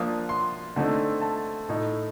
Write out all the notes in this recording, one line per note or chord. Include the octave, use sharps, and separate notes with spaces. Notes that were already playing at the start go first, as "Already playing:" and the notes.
Already playing: F3 A#3 D4 D#6
C6
D3 A3 C4 D#4
A5
A2 A3 D#4